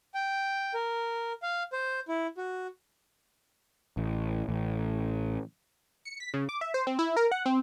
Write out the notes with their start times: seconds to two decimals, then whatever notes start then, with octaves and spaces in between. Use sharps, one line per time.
0.14 G5
0.74 A#4
1.42 F5
1.73 C5
2.08 E4
2.37 F#4
3.97 A1
4.49 A1
6.05 C#7
6.20 B6
6.34 C#3
6.49 D6
6.61 E5
6.74 C5
6.87 C4
6.99 E4
7.17 A#4
7.32 F#5
7.46 C4